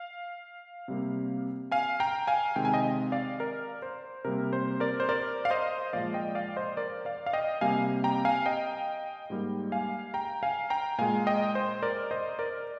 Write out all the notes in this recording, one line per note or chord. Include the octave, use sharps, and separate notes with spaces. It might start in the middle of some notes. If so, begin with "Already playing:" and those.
Already playing: F5
C3 G3 A#3
F5 G#5
G5 A#5
F5 G#5
C3 D#3 G#3 G5
G#5
D#5 G5
D5 F5
A#4 D5
C5
C3 G3 A#3 A#4
C5
A#4 D5
C5
A#4 D5
F5
C5 D#5
A#2 F3 G#3 D5 F5
D#5 G5
D5 F5
C5 D#5
A#4 D5
D5 F5
F5
D#5 G5
C3 G3 A#3 F5 G#5
G5 A#5
F5 G#5
D#5 G5
G#2 G3 A#3
F5 G#5
G5 A#5
F5 G#5
G5 A#5
A#2 G#3 F5 G#5
D#5 G5
C5
A#4 D5
C5 D#5
A#4 D5